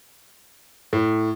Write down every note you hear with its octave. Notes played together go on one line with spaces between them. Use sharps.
A2